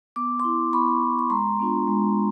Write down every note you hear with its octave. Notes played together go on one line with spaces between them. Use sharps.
B3 D6
E4 C6 D6
B3 B5 C#6
E4
C#6
G#3 A#5 C6
B3 D4 F4
G#3